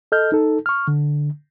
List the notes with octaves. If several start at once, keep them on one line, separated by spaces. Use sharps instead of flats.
A4 D#5 F6 G6
D#4 A4
C#6 F6
D3